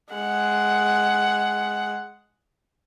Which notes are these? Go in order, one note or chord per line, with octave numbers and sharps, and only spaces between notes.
G#3 F#5